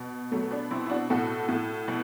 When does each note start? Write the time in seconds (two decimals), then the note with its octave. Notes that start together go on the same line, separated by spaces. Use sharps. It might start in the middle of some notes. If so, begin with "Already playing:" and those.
Already playing: B2
0.31 B2 F#3 A3
0.51 B3 D4
0.70 B2 C4 E4
0.86 E4
0.90 D4 F#4
1.10 A2 F#4 A4
1.48 A2
1.88 B2